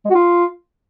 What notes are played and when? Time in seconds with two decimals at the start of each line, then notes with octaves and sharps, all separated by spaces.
0.05 G#3
0.10 F#4
0.15 F4